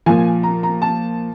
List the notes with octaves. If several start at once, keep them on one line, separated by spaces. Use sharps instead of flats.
A#2 F3 G#5
A#5
A#5
A5